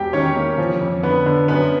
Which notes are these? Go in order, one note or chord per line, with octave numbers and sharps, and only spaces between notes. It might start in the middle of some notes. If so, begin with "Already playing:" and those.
Already playing: E1 G4 G5
D#3 C#4 C#5
A#3
F3
F2
D3 B3 B4
D3
F#2 B3 B4